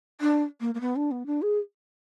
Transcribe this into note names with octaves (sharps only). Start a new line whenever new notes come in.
D4
A#3
A#3
B3
D4
B3
D4
G#4